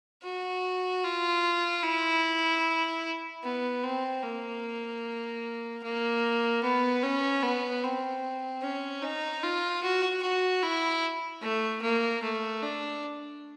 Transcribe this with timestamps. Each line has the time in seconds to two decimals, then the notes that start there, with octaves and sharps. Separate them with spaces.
0.23 F#4
1.03 F4
1.82 E4
3.43 B3
3.83 C4
4.23 A#3
5.83 A#3
6.63 B3
7.03 C#4
7.43 B3
7.83 C4
8.62 C#4
9.02 D#4
9.43 F4
9.83 F#4
10.22 F#4
10.63 E4
11.42 A3
11.82 A#3
12.22 A3
12.62 D4